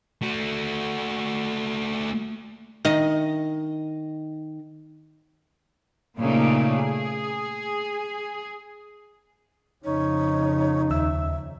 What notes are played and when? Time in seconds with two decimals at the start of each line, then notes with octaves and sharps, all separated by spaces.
0.21 A3 F#4
2.85 D#3 D#5
6.18 A#2 C#3 A3 A#3 D#4
6.78 G#4
9.85 F2 C#3 D#4 C#5
10.91 D#2 E5 E6